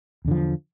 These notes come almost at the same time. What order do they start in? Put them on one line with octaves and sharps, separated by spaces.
E2 D3 F3